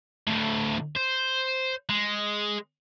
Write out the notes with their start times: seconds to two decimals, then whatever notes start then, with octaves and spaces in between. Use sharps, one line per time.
0.27 D2 A2
0.95 C5
1.89 G#3